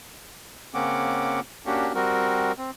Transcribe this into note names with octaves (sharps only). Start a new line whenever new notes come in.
C#3 A#3 C4 C#4 F#5 D6
A#3 C#4 D4 F#4 G4
G3 C4 F#4 A#4
C4